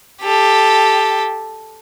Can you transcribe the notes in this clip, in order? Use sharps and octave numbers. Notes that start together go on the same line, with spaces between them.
G4 A4